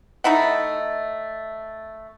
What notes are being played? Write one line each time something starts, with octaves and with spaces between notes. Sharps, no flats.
A3 D#4 E4 F#5